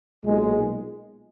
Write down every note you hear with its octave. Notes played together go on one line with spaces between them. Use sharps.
B1 A#2 G#3